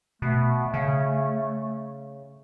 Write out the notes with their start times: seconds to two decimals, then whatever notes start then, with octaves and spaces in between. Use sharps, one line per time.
0.22 B2 A3
0.74 C#3